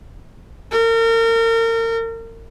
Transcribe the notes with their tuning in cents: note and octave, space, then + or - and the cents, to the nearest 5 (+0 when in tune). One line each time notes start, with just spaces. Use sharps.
A#4 -35